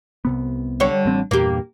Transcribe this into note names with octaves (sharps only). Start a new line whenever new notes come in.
C2 C3 B3
D3 G3 C#5
A1 C4
E2 G2 A#2 A#3 G4